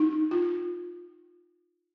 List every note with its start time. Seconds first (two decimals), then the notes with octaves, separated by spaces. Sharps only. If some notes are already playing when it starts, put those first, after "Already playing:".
Already playing: D#4
0.31 F4